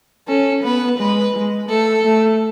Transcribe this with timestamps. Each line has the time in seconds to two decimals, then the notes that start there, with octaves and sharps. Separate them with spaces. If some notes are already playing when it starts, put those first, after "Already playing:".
0.28 C#4 A4
0.64 B3 B4
0.99 G#3 B4
1.34 G#3
1.68 A3 A4
2.04 A3